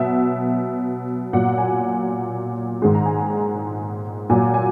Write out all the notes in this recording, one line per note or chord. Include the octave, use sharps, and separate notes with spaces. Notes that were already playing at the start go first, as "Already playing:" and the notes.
Already playing: B2 F#3 E5
A#2 F#3 F#5
G#5
G#2 D#3 G#3
A#5
G#5
A#5
A#2 F#3 G#5
G#5